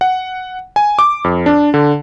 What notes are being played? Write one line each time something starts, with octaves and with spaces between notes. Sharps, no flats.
F#5
G#5
D6
F2
D4
D3